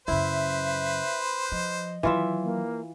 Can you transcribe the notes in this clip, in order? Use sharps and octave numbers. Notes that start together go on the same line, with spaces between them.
F#2 C#3 E4 B4 C5 E5
F3 D#5
D#3 E3 F#3 F4 E5
A#3